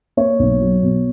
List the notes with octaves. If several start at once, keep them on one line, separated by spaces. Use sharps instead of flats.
A#3 C#5
B1
F#3
B2